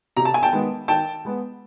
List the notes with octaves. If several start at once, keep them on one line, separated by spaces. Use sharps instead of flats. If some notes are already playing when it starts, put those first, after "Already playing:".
C3 A#5
A5
G#5
G5 A5
D#3 G#3 B3
D#3 G5 A5
G#3 B3